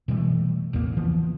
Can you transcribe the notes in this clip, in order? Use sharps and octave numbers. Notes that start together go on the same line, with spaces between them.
B2 E3 G3 A3
A1 E2 A2 A#3
C#3 E3 F3 B3